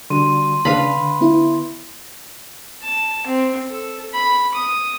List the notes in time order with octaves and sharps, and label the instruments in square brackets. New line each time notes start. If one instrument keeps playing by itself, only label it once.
[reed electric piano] D3 G3 F#4 [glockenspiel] C6 D#7
[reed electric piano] C#3 D4 A5 [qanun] B4 F5 B5
[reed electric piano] D3
[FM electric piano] B3 E4
[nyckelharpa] A5
C4
A4
B5
D#6